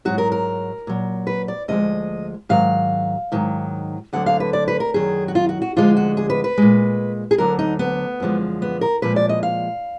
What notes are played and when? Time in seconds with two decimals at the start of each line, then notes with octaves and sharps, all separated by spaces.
0.05 G#2 F#3 F#4
0.18 A#4
0.32 A#4
0.87 A#2 F#3
1.27 B4
1.48 D5
1.68 D2 D3 F3 G#3 D#5
2.49 G#2 D#3 F#3 F5
3.32 G#2 D#3 F#3
4.13 D2 D3 F#3 F#5
4.26 F5
4.40 B4
4.53 D5
4.68 B4
4.80 A#4
4.94 F#2 D#3 F#3 G#4
5.28 F#4
5.35 F4
5.49 F#4
5.62 F#4
5.76 D2 D3 F3 G#3 F4
5.97 F#4
6.17 G#4
6.30 B4
6.44 B4
6.58 A#2 G#3
7.31 G#4
7.38 D2 D3 F#3 A#4
7.59 D#4
7.79 B3
8.20 F#2 D3 F3 G#3
8.62 B3
8.81 A#4
9.02 A#2 F3 G#3 B4
9.16 D5
9.29 D#5
9.43 F5